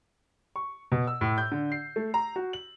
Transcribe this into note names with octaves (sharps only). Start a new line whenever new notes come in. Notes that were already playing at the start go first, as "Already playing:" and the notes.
C#6
B2
E6
A2
G6
D3
C7
A3
A#5
F#4
F#7